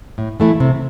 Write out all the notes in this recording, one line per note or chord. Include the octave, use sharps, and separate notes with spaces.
A2
E3 A3 E4
C3